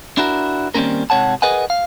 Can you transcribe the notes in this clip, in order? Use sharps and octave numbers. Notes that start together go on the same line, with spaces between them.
D4 E4 F#4 A4 A#4
D#3 G3 A#3 C4 C#4 A#4
G#2 C3 C#5 F#5 A5
G#4 A#4 B4 D#5 F#5 G#5
F5